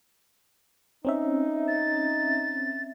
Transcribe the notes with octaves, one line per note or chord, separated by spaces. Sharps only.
C4 C#4 D#4 E5
A6